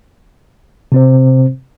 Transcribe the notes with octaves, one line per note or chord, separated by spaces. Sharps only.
C3 C4 C5